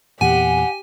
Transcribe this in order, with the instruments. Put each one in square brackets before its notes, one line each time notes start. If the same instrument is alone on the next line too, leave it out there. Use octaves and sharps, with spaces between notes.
[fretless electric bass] E2 A#2 [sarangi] G4 [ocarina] F#5 [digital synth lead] G#5